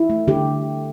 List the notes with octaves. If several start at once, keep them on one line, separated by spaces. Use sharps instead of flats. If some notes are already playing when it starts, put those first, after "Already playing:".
Already playing: E4
A3
D3 G4